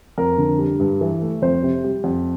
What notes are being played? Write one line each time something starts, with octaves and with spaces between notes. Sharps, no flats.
F2 A#4
D3
G3
G2
E3
A3
F2 C5
C3
G3
F2